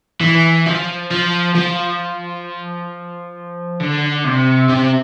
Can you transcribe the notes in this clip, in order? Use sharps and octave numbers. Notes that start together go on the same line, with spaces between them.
E3
F3
F3
F3
D3
C3
C3